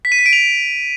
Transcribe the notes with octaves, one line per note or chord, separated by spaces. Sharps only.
B6
D#7
B6
D7
F7